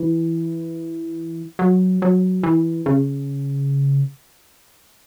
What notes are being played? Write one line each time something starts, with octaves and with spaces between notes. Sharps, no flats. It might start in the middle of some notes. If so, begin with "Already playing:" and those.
Already playing: E3
F#3
F#3
E3
C#3